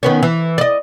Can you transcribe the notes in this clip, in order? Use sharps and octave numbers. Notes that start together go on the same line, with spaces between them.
D#3 B3 C#4
E3
D5 D#5